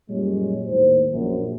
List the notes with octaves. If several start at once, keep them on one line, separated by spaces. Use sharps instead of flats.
F#2 A#2 G3 G#3 G4 C#5
D#2 A2 A3 C5
A#1 F#2